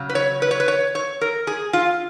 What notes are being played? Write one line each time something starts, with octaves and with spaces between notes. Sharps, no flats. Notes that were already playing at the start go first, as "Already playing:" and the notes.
Already playing: C#3 F#3
B4
C#5
B4
C#5
B4
C#5
C#5
A#4
G#4
F4